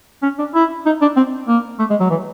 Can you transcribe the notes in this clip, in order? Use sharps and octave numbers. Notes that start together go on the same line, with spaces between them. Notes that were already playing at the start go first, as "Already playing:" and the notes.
C#4
D4
E4
D#4
D4
C4
A#3
A3
G#3
F#3
E3